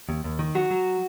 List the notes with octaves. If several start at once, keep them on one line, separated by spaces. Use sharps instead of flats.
D#2
D#2
D#3
F#3 F#4
F#3